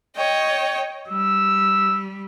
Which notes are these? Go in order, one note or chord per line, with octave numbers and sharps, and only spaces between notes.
C#5 D#5 G5
G3 E6